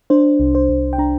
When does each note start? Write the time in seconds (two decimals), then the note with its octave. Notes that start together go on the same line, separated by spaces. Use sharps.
0.10 D4 C5
0.40 C2
0.55 C5
0.69 C2
0.93 G5
0.98 D4 A#5